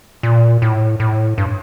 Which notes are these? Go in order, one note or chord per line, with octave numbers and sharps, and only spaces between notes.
A#2
A2
A2
G2